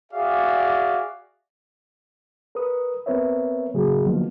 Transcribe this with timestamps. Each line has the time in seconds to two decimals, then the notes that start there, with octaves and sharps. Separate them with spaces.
0.12 F#4 G#4 D5 E5 F5
2.55 A#4 B4 D#6
3.06 B3 C4 A#4 B4 C#5 E5
3.74 A2 C#3 F#3 A#3 F#4 G#4
4.05 D3 F3 F#3 A#3 B3 D#4